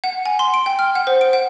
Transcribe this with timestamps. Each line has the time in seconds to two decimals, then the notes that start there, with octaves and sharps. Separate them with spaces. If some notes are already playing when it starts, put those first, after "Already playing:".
0.04 F#5
0.26 G#5
0.39 C6
0.54 D7
0.66 G5
0.79 F6
0.95 F#5
1.07 C5
1.21 D7
1.33 F#5